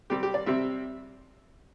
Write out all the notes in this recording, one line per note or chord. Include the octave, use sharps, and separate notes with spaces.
C3 G3 C4 G4
G4
D5
C3 G3 C4 E5